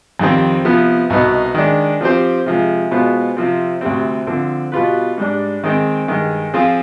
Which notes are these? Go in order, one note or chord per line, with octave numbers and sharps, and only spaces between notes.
F2 D#3 G3 C4
C3 F3 B3
C2 B2 B3 D#4
D#3 G#3 D4
F3 C4 G4 C5
C3 F3 G#3
B2 G#3 B3 F4 C5
C3 F3 C4
D2 C3 G3 C4
D3 F3 C4
B2 G3 B3 F4 B4
G#2 G3 D4
D#3 G#3 C4 D#4
G2 D#3 G#3
F3 C4 F4 G#4